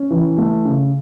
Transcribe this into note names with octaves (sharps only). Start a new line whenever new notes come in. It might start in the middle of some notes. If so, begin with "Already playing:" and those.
Already playing: C#4
E3
A3
C#3